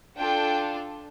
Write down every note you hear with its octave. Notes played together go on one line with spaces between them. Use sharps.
D4 F4 A4 G5